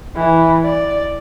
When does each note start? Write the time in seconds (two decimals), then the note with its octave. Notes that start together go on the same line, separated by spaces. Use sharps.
0.16 E3
0.64 D5